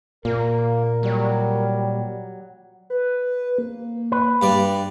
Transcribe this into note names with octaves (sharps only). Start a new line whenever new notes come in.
A#2 A#3 A#4
F#3 G3
B4
A#3
B4
G2 D5